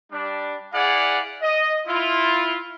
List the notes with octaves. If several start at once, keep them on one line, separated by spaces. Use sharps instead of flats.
G3 D4
E4 G#4 D5 F5 F#5
D#5
E4 F4